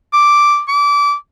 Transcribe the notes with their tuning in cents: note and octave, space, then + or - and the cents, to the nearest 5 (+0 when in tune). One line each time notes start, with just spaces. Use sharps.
D6 -5
D6 -25